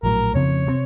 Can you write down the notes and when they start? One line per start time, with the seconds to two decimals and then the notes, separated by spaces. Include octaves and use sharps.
0.03 A#1 A2 F#3 A#4
0.34 F2 C#3 F3 C4 C#5
0.67 C3 F#3 C4